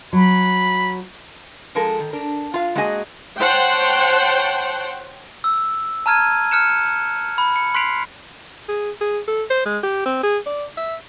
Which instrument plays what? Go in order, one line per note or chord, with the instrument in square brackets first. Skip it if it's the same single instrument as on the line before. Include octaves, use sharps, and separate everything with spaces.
[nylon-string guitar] F#3 [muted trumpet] B5
[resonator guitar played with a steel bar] F3 G#3 A4 A#4
D#3
D4 A#4
F4 F5
G#3 A#3 F#4 G#4 D#5 G#5
[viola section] C5 C#5 F#5 G5 A5
[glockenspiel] E6
A5 A#5 F6 G#6 D#7
F6 F#6 C#7 E7
B5
C#7
C6 F#6 B6 C7 D7 F7
[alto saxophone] G#4
G#4
A4
C5
G#3
G4
C4
G#4
D5
E5